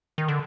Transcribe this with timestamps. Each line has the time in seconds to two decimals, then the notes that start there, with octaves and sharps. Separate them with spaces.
0.18 D#3
0.28 D3